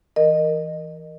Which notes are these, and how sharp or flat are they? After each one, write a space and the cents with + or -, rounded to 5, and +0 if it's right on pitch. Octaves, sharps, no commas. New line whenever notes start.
E3 +0 A#4 +0 D#5 -20